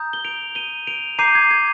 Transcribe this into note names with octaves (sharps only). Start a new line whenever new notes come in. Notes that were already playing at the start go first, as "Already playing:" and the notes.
Already playing: A#5 D#6 G6
G7
D7 F7
D#7 G7
D7 F7
A#5 D6 G6 C7 D#7
G#6
G#6